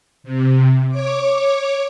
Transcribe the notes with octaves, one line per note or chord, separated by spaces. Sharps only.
C3
C#5 D6